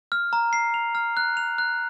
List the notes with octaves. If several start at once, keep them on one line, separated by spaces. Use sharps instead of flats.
F6
A#5
C7
F7
F6
F#6
F7
F#6